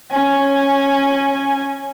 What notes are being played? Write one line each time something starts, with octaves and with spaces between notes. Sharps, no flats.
C#4 G#5